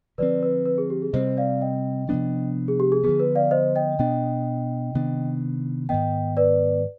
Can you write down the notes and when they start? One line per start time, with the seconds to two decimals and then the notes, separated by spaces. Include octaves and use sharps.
0.18 D3 F3 C4 B4 D5
0.43 B4
0.66 B4
0.78 G#4
0.90 G4
1.02 G#4
1.13 C3 G3 C4 C5 D#5
1.37 D5 F5
1.61 D#5 G5
2.09 C3 F3 B3 D4
2.68 G#4
2.80 G4
2.92 G#4
3.03 D3 F3 B3 G#4
3.20 B4
3.36 D5 F5
3.51 C5 D#5
3.75 D#5 G5
3.99 B2 B3 D4 D#5 G5
4.95 C3 D#3 B3 D4
5.89 G#2 D#3 B3 D#5 G5
6.37 B4 D5